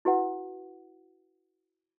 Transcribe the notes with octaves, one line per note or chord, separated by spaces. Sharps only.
E4 F#4 B4 F#5